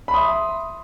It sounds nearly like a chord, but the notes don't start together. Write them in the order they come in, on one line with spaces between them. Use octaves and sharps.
B5 C6 D#6 E5